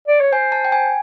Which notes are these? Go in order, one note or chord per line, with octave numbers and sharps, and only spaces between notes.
D5
C#5
C5 G#5
A5
G5
G#5